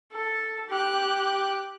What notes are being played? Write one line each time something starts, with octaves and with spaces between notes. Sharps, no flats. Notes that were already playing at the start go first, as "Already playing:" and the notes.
A4
G4 F#6